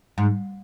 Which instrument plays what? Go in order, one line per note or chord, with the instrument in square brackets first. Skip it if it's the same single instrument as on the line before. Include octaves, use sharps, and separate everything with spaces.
[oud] G#2